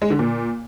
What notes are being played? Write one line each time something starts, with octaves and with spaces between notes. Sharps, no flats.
G#3
D3
A#2